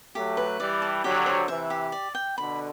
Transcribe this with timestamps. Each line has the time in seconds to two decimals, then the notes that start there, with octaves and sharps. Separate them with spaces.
0.14 F#3 A3 G4
0.37 B4
0.59 E3 G3 D5
0.82 A5
1.03 D3 F#3 G4
1.26 C5
1.48 C3 E3 E5
1.70 G4
1.92 D5
2.15 G5
2.38 B2 D3 B5